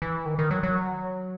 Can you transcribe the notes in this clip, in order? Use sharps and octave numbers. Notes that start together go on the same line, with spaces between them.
E3
D#3
D#3
F#3
F#3